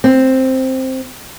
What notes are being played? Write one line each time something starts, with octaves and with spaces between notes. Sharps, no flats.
C4